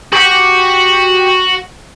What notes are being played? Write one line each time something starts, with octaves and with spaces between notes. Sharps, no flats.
F#4 G4 F#5